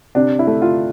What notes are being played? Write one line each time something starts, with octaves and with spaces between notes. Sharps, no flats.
C3 D4
E4
A3
F4